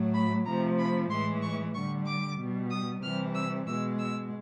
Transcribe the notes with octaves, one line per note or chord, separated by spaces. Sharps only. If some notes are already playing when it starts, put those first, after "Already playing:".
Already playing: A2 F#3 A3
B5
C3 F3 A3 A#5
B5
A2 E3 G#3 C6
C#6
D3 G3 C#6
D6
B2 G3
D#6
C3 E3 G3 F6
E6
B2 G#3 E6
E6